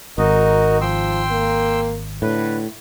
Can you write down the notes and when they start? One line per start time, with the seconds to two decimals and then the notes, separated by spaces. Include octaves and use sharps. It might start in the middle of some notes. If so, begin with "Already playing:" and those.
0.18 G#1 D#4 F#4 A#4 D#5
0.81 F3 G5 C6 E6
1.31 A#3
2.22 A2 D3 B4